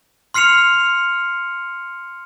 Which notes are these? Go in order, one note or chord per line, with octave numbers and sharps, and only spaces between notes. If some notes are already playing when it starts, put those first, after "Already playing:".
C6 F6 C7 C#7 F7